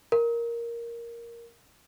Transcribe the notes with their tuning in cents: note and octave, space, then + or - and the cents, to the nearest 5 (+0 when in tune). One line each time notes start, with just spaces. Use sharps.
A#4 +5